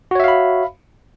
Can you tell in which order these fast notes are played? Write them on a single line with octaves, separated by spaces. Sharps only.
F#4 C#5 E5 F5 B5